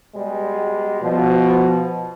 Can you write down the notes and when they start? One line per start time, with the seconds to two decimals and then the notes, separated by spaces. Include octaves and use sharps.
0.15 B2 G3 G#3
1.03 B2 F3